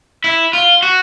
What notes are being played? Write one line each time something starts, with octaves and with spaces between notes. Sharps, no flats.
E4
F4
F#4